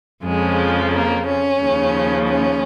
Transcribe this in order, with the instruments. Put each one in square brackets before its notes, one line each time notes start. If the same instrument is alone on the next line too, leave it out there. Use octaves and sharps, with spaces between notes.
[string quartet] F2 C#3 F3 G#3
A#3
C#4
D#2 C#3 F3
C#4